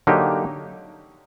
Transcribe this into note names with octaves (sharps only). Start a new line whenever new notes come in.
D3 F#3 A#3 D#4 G4